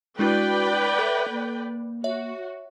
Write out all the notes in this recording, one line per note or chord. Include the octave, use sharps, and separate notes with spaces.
G#3 D4 E4 F#4 B4 D5 G5
A4 E5
A#3
F#4 C#5 E5